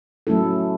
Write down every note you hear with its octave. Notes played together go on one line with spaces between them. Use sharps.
F#3 A3 C#4 E4 A4